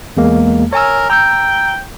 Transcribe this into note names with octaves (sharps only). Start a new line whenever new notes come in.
E2 G#3 A#3
A#4 C#5 G#5 E6
G5 A#5 E6 G6